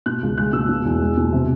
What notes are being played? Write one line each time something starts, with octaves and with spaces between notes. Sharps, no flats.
B2 F#6
C#2
G#3 F#6
B2 E6
B2
E2
G#3
B2
C3